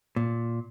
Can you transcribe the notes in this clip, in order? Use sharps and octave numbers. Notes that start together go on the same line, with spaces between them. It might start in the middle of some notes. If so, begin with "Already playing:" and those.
A#2